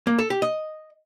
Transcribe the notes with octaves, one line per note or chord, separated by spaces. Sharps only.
A#3
A4
G4
D#5